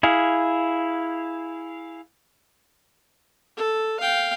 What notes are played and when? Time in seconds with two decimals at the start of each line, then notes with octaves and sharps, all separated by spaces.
0.03 E4 G#4 F5
3.57 A4
4.00 F5 G5